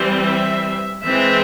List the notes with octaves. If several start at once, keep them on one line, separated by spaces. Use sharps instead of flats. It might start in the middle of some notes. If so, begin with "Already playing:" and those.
Already playing: E3 G3 C4
E5
E3 G#3 C4 E5